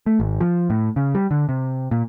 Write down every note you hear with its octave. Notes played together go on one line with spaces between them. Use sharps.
A3
G#1
F3
A2
C#3
G3
D3
C3
A#2